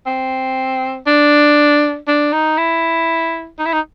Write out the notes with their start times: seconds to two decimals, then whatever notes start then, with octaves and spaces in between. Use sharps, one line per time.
0.06 C4
1.07 D4
2.08 D4
2.33 D#4
2.58 E4
3.59 D#4
3.66 E4
3.73 D#4